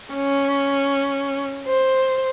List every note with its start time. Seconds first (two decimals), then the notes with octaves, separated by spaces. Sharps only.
0.14 C#4
1.67 C5